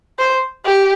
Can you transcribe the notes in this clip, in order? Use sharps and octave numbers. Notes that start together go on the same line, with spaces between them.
C5
G4